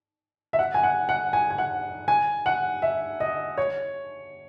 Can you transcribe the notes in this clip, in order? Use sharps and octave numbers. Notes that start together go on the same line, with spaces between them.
E5
F#5
G#5
F#5
F#5
G#5
G#5
F#5
G#5
F#5
E5
D#5
C#5